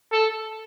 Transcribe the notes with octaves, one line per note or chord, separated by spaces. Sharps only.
A4